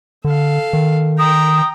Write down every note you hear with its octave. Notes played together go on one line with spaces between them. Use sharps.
D3 A4 F5
D#3
G5 A#5 D#6